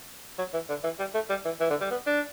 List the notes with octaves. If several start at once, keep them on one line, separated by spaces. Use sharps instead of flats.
F#3
E3
D3
E3
G3
A3
G3
E3
E3
D3
G3
B3
D4